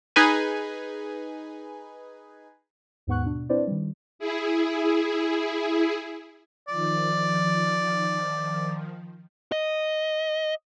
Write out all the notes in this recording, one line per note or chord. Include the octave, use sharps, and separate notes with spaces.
D#4 G#4 B4 G#5
D#2 G#2 B3 F#5 C#6 F#6
B2 D4
C4 D4 E4 B4 C5 D5
D#3 G3
E4 G#4
D#3 F3 D5
D#5